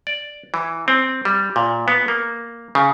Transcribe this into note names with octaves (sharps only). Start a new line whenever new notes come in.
D5
E3
C4
G3
A#2
B3
A#3
C#3